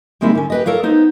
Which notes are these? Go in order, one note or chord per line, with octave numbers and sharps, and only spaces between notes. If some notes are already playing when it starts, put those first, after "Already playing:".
D#3 G3 G#3 A#3 C4 E4
D3 C#4
G4 B4 D#5
A4 A#4 C#5 F5
B3 D#4 C5